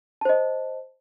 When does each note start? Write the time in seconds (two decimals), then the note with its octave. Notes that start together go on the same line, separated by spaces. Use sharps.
0.21 A5
0.25 C5
0.29 D#5